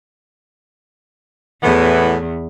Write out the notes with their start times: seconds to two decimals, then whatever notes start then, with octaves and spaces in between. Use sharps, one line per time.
1.63 E2 A2 E3 B3